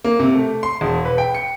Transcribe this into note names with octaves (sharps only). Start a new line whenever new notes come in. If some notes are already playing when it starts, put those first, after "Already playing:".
A#3
C3
A3
C6
E1
B4
G5
C#7